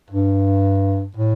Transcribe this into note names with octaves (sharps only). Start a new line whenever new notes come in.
G2
A2